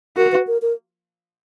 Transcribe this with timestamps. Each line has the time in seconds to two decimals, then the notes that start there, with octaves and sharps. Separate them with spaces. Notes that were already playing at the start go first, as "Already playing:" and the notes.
0.17 F#4 A#4
0.32 B4
0.47 A#4
0.62 A#4